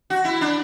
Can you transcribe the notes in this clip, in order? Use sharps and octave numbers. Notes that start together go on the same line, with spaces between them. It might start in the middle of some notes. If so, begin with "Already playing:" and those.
F#4
E4
D4